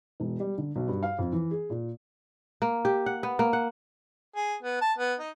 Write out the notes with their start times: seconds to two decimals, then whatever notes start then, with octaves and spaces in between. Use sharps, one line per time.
0.20 E1
0.40 G3
0.58 D3
0.76 B1
0.88 G2
1.03 F5
1.18 F2
1.32 E3
1.51 G#4
1.70 A#2
2.62 A#3
2.85 G4
3.06 F#5
3.23 B3
3.39 A#3
3.53 F#5
4.36 G#4
4.63 B3
4.82 A5
4.98 B3
5.19 D#4